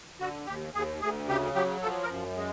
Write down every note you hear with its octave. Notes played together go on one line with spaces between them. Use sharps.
D3 F#4
D#2 G4
D#2 G#4
D2 G#4
C#3 G4
F#3 G4
F3 A4
A#4
F#2
G#3